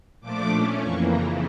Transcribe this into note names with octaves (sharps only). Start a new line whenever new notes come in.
A#2 F3 A3 D4 D6
A#2 A3 C#4
F2 E3 A#3 C#6
F2 C#3 E3 A#5